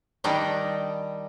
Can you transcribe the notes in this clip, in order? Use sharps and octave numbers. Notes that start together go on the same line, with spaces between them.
D#3 G3 D4 D#4 G4